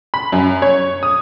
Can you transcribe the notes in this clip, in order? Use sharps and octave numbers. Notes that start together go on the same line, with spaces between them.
B5
F#2
C#5
D#6